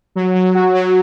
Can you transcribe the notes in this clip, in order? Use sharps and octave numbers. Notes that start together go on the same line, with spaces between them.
F#3
F#3
F#4
F#3